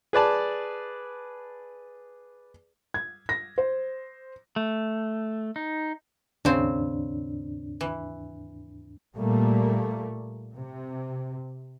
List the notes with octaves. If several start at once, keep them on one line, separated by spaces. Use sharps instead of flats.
G#4 B4 D5 A5
G#6
A#6
C5
A3
D#4
D#2 G#2 C#3 C4 D4
E3
A#2 G3 A3 A#3
C3